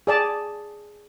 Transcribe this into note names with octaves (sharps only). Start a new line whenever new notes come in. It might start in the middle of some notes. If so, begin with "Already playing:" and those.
G#4 D5 A5